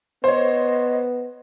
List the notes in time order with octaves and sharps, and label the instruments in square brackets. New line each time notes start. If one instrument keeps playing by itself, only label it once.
[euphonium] B3 [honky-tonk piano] C5 C#5 [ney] D#5